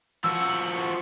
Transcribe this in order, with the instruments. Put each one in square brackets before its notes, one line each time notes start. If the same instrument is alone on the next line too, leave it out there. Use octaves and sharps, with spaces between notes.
[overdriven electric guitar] F3 F#4 [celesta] E6